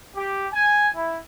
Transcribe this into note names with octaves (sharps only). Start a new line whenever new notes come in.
G4
G#5
E4